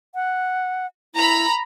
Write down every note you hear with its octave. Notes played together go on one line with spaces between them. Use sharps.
F#5
E4 A#5 B5